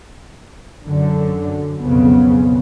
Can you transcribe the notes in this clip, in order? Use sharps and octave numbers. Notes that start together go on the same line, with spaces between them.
F#2 D3
B1 F2 C#3 B3